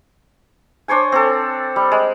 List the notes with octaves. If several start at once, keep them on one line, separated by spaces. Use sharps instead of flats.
D4 C5 C#5 G#5
C4 A4
G3
G#3